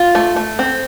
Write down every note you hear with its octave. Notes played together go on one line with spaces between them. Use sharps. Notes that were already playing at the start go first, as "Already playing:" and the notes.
Already playing: F4
A3
A3
C4